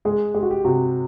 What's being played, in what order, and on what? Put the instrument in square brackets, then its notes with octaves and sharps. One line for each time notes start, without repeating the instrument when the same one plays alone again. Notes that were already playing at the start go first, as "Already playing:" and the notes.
[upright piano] G#3 [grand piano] G#4
[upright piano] G#3 [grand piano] G4
[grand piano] F#4
G4
[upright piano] C3 [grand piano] F#4